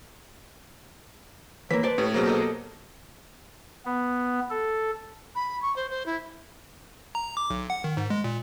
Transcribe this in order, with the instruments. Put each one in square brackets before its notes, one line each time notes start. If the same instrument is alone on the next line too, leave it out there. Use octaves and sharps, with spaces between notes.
[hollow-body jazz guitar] E3 A#3 [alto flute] C#5 [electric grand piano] B6
[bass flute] B4 [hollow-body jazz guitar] C5 D5 A5
[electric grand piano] A2 [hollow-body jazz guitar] C#4 [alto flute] G4
[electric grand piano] B2 F#3 A#3 [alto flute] G#4 [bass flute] C5
[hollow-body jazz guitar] G4 A4 D#5
[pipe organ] B3
A4
[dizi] B5
C#6
C5
C5
E4
[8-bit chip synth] A#5
D6
B1
F#5
D#3
G#2
G#3
A#2